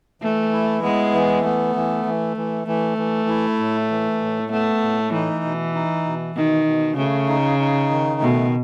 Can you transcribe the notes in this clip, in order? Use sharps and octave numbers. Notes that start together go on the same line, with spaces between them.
E3 A3
E4
G#3 B3
E3
A3 B3
E3
E3
E3
E3 A3
E3
E4
A2
E3
A2
A3 B3
A2
E3 D#4
B2
D#4
B2
B2 D#3
B2
C#3 A3
D#4
D#4
D#3
B2 A3